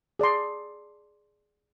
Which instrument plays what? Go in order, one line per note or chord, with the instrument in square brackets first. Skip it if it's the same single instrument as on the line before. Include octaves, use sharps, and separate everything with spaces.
[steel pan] G#4 D5 A5 C6